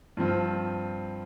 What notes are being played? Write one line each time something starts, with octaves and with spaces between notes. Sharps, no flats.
G2 F3 C4 F4